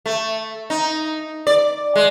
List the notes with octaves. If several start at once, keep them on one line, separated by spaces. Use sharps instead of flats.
A3
D#4
D5
G#3